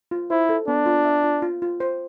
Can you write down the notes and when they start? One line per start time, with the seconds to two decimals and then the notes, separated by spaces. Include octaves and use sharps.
0.11 F4
0.30 E4 C5
0.49 A4
0.68 B3 D4
0.86 F4
1.05 E5
1.23 F4
1.42 F4
1.62 F4
1.80 C5